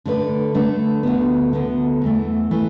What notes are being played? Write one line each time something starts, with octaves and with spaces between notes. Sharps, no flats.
D3 A3 D4 B4
D3 A3 D4 B4
D2 D3 B3
D2 D3 B3
E2 E3 A3
E3 A3